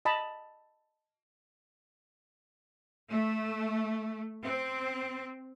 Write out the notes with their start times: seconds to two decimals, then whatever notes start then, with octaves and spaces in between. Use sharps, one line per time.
0.05 D#5 A5 B5
3.09 A3
4.42 C4